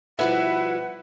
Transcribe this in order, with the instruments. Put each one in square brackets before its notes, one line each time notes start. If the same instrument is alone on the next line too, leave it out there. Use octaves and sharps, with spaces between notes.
[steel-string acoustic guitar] B2 F3 G3 [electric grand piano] E4 B4 E5 [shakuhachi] F#5